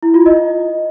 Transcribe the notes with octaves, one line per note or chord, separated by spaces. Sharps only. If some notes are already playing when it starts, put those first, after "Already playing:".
E4
F4
D#5